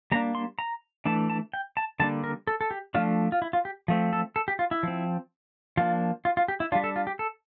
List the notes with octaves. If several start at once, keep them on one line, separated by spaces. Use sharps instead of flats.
G3 A#3 D4 A#5
C6
A#5
E3 A3 D4 A5
A5
G5
A5
D3 G3 A#3 D4 A5
A#4
A4
A4
G4
F3 A3 D4 F4
F4
E4
F4
G4
F3 A3 C4
A4
A4
G4
F4
E4
F3 C4
F3 A#3 D4 F4
F4
F4
G4
E4
G3 D4 F4
A4
F4
G4
A4